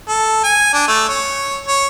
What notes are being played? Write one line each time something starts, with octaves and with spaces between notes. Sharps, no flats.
A4
G#5
D4
A3
C#5
C#5